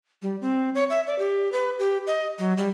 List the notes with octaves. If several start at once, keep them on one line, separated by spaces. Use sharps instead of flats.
G3
C4
C#5
E5
D5
G4
B4
G4
D#5
F#3
G3